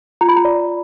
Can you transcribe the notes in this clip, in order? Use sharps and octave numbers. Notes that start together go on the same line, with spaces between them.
F4 A#5
B5
A#5
D5